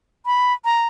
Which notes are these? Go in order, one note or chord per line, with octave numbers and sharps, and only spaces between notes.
B5
A#5